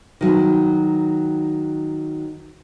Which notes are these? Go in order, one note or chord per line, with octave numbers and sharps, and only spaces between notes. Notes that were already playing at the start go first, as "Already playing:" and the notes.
D#3 F#3